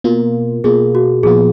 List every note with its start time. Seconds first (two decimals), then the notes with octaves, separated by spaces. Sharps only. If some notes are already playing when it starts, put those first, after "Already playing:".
0.04 B2 A#3 F4 A#4
0.64 B2 A#3 F4 G#4
0.95 F#4
1.23 A#2 F3 B3 F4 G#4